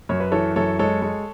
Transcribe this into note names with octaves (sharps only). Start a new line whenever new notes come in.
F#2 C#5
B4
E3 A4 C#5
F#2 A4 C#5
G#3 A4 C#5
G#3